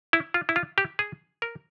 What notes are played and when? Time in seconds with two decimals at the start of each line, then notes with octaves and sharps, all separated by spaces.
0.13 E4
0.34 F4
0.49 E4
0.56 F4
0.78 G4
0.99 G#4
1.42 A#4